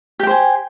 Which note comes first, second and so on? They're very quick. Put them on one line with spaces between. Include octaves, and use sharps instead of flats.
G4 G5 C5 G#5